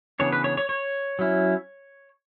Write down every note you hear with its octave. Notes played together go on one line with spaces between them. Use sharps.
C#3 E3 B3 D4 C#5
B4
C#5
C#5
C#5
F#3 C#4 E4